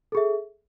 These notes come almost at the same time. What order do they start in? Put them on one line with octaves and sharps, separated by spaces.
A4 G#4 E5